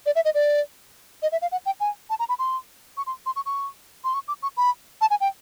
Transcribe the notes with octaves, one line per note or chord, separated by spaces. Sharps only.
D5
E5
D#5
D5
D#5
E5
F5
F#5
G5
G#5
A5
A#5
B5
C6
C#6
C6
C6
C#6
C#6
C6
C#6
D6
C#6
B5
A5
G#5
G5